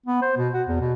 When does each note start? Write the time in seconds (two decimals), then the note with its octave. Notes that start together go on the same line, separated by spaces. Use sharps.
0.06 B3
0.22 C5
0.37 B2
0.54 F#4
0.68 E2
0.80 B2